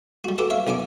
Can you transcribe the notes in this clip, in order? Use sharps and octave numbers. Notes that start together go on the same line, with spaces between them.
G3 F#4
F#4 G4 A4 B4 F#5
C#5 E5 F5
B1 B3 C#4 G#5 D6